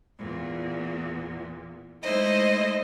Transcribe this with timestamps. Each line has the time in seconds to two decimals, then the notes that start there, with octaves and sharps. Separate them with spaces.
0.18 E2 A#2
2.02 G#3 A3 D#4 E4 C5 D#5